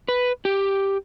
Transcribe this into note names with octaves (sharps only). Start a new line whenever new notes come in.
B4
G4